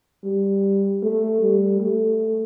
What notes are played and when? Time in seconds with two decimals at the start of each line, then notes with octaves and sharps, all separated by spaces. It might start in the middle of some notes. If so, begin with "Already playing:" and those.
0.24 G3
1.02 A3
1.41 G3
1.80 A3